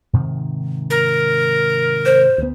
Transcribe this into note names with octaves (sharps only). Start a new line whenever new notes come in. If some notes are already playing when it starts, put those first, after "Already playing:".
G#2 C3 D#3
A#4
C5
D2 B3